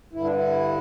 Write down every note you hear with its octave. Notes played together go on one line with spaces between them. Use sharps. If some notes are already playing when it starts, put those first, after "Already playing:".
G2 D3 E4
D4
E4